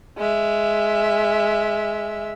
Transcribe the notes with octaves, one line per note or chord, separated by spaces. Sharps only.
G#3 E5